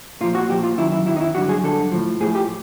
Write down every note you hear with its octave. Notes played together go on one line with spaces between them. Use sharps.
A#2 F3 F4
F#4
A#2 F3 G4
F4
F#2 D#3 F#3 E4
E4
F#2 D#3 F#3 E4
D#4
E4
G2 D3 F#3 F#4
G#4
G2 D3 F#3 A4
A2 F3
A2 F3 G#4
G4